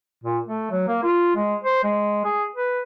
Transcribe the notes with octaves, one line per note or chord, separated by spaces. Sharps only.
A#2
A3
F#3
A#3
F4
G#3
C5
G#3
G#4
B4